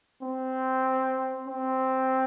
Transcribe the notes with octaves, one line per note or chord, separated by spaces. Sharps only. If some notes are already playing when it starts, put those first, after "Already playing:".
C4
C4